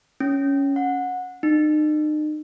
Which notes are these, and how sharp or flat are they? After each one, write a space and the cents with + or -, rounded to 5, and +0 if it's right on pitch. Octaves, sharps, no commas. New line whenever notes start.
C#4 +5
F#5 -20
D#4 -40